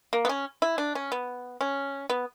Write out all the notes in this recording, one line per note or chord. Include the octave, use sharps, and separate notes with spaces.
A#3
B3
C#4
E4
D4
C#4
B3
C#4
B3